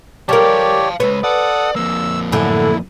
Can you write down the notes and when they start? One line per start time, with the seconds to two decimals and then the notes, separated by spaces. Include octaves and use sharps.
0.29 G3 G4 A#4 C#5 D5 F5 A5
1.00 G#3 B4 C#5
1.24 A4 D5 F#5 D#6
1.76 F2 A#3 E6
2.32 F#2 A2 D3 E4